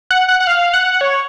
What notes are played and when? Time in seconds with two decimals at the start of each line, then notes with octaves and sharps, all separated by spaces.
0.11 F#5
0.29 F#5
0.40 F#5
0.47 F5
0.74 F#5
1.01 C#5